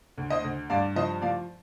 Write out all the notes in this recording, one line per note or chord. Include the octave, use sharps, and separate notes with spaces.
D2
C5 D#5
D2
G2 D5 F5
F3 C5 D#5
F3 D5 F5